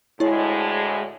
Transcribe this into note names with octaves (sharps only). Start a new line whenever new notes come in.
D2 A2 G#3 E4 C#5